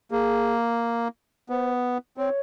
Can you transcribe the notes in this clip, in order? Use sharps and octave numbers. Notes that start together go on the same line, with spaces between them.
A#3 G#4
B3 C5
C4 C#5